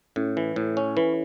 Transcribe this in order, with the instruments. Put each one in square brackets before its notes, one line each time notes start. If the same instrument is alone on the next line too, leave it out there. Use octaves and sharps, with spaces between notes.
[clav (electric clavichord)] A2 [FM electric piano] C#4
[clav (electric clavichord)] E3 [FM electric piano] E4
[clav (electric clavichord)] A2 [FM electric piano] A4
[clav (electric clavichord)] C#4 [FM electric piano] C#5
[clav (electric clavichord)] E3 [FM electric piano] B4